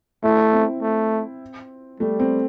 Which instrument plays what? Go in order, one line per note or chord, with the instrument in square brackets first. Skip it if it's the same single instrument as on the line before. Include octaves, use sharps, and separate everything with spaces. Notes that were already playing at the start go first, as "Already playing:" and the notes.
[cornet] A3 [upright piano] E4
[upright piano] C4
[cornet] A3
[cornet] G3 [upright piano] A3
[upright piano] C4